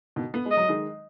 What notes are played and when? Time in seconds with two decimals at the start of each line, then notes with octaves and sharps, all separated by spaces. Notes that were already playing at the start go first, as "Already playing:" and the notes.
0.16 B2 D#3
0.34 B3
0.45 G#3
0.51 D#5
0.57 F#3
0.69 D#3 G#3